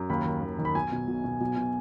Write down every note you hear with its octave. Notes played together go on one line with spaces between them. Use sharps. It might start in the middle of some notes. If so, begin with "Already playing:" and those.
Already playing: F#2
D#2 B5
D#3
D#2
D#3
B5
B1 G#5
B2
B1
B2
B1
B2